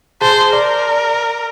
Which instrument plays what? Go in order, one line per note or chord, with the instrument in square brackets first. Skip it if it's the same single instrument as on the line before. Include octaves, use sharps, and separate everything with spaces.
[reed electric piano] G#4 A5 [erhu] C5
[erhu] A#4 [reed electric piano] D5